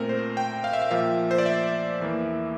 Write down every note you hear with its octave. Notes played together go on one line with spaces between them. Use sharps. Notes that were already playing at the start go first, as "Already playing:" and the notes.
Already playing: A#2 A3 C4 A#4
C5
G5
F5
E5
F5
A#2 F3 A#3 E5
C5
D5
E5
E2 E3 A#3